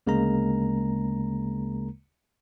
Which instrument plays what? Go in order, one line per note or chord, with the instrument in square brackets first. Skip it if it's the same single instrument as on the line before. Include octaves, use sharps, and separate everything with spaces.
[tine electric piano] D2 C#3 G#3 A#3 A#4 A#5